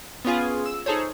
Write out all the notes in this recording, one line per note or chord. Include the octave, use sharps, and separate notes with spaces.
B3 C#4 F4 G#4
E6
D#4 G#4 A4 C5 C#5